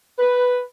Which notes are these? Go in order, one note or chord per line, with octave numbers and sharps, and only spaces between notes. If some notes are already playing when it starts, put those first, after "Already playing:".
B4